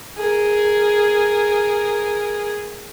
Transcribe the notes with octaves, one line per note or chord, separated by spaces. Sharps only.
G#4 A#4